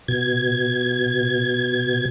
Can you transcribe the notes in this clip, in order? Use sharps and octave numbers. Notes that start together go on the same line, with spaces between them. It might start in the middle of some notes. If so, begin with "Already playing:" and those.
B2 G#6